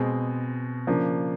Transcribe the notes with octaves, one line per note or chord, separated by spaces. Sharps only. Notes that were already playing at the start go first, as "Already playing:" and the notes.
Already playing: B2 G#3 C4
C#3 F3 A#3 D4